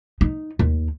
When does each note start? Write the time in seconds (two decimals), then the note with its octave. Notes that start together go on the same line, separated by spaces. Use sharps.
0.21 D#4
0.59 D#2